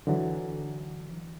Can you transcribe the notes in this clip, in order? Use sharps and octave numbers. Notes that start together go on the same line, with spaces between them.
D3 E3 F#3